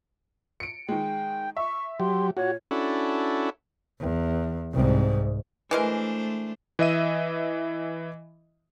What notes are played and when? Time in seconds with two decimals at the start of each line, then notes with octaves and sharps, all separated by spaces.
0.60 C#7 D7
0.89 D#3 G#3 G5
1.57 E5 C#6
2.00 F#3 G4 C6
2.37 A#2 F#4 C#5
2.71 C#4 D4 E4 F#4 A4
4.00 E2
4.73 C2 G#2
5.71 E3 G#3 A3 D4 A#4 C5
6.79 E3 D#5 E5 D#7